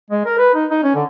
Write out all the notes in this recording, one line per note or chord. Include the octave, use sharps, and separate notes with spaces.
G#3
A#4
B4
D#4
D#4
C#4
D3